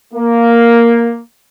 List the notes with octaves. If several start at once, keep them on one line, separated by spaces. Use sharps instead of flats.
A#3